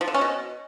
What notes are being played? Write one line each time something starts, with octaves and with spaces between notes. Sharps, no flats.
F3
D3
C#4
B2